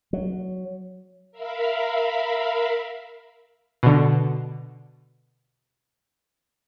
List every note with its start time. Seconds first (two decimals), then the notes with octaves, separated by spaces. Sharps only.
0.13 F#3
1.32 A#4 E5 F5 B5
3.83 B2 D3